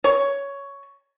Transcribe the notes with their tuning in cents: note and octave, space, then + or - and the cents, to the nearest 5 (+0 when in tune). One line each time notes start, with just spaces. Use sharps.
C#5 +10